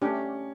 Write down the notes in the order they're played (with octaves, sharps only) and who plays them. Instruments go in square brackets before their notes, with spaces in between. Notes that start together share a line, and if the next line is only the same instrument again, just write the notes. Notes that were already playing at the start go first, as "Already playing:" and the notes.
[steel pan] A3 D4 G4 [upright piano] C#4